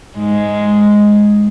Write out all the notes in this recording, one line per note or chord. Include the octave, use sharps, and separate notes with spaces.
G#2 G#3